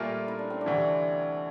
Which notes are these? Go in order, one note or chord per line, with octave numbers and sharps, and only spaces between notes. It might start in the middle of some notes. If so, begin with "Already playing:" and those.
Already playing: A#2 G3 A3 A#3 F4 A#4
E4
D4
C4
D4
D2 C3 E3